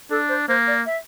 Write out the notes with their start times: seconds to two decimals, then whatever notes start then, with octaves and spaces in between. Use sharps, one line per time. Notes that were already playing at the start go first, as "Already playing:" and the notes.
0.10 D4 A4
0.29 C5
0.48 A#3 C5
0.67 D5
0.86 E5